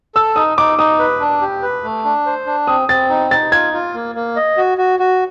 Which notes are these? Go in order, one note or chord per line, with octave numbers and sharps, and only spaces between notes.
A4 E6
D#4 D#6
D#4 D6
D#4 D#6
B4
D4
G4
B4
A3
D4
C5
D4
C4 D#6
C4 A6
D#4
D#4 A6
F4 G#6
F4
A#3
A#3
D#5
F#4
F#4
F#4